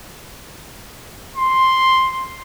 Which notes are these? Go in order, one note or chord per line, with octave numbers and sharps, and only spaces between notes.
C6